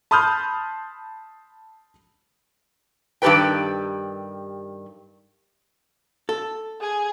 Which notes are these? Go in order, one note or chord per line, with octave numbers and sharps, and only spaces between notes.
A5 B5 C6 D#6 F6 G6
G2 D#3 G4 A4 B4 G5
A4
G#4 G#5